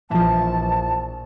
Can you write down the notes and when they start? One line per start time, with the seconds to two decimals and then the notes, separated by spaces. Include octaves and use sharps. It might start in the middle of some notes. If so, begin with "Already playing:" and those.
0.10 A#1 E3 F3 A5